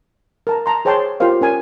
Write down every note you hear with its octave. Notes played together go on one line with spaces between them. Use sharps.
A#4 A5 A#5
A5 A#5 C6
G#4 C5 C#5 G5 A5 C6
F4 G4 A#4 C5 F5
C#4 A#4 G#5